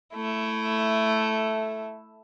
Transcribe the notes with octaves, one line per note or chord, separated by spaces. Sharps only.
A3 E4